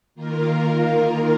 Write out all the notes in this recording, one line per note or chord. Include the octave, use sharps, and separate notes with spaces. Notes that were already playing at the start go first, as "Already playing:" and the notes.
D#3 A#3 F4 A#4